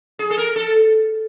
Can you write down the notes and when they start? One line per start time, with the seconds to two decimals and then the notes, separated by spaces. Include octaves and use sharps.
0.19 G#4
0.30 A4
0.38 A#4
0.56 A4